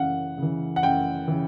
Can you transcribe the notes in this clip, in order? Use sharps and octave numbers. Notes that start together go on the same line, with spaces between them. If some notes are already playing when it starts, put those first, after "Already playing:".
Already playing: F#2 C#3 E3 F5 F#5
C#3 E3
F#5
F#2 G5
C#3 E3